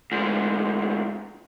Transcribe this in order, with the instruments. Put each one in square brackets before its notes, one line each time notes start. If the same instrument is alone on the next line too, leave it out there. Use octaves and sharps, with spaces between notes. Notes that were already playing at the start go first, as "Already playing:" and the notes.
[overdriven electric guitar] D2 G#2